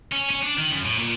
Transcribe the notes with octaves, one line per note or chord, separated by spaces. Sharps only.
C#4
C#4
D4
D#3
F#2
A2
A#2